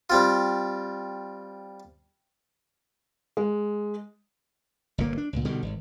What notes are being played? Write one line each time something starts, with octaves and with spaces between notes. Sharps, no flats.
G3 C4 F4
G#3
G1 A#2 A#3
D4
C#2 A#2
B2 D3 D#3 G3
G#1